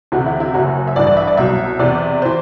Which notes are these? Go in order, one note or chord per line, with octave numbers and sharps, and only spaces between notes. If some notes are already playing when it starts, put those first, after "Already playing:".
D2 C3 E3 F#4
E4
E4
F#1 F#2 F#3 F#4
E5
A1 G2 E3 D5
D5
E5
D5
C2 B2 F#3 E5
E2 C3 E3 D5
E3 C5